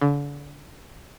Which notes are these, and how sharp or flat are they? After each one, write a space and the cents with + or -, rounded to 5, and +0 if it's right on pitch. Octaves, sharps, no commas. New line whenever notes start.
D3 -35